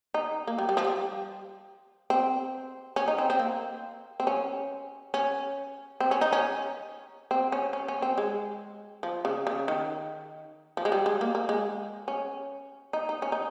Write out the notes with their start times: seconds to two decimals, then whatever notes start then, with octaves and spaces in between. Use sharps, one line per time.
0.14 D#4
0.47 A#3
0.58 G3
0.69 G3
0.77 F3
0.84 G3
2.10 C4
2.96 C#4
3.08 D#4
3.18 C4
3.30 C4
3.39 A#3
4.20 C4
4.27 C#4
5.14 C#4
6.00 C4
6.11 C#4
6.21 D#4
6.33 C#4
7.31 C4
7.52 C#4
7.73 C#4
7.88 C#4
8.02 C4
8.18 G#3
9.03 F3
9.25 C#3
9.47 C#3
9.68 D#3
10.77 F3
10.85 G#3
10.92 G3
11.06 G#3
11.21 A#3
11.35 A#3
11.49 G#3
12.08 C#4
12.93 D#4
13.09 D#4
13.22 C#4
13.32 D#4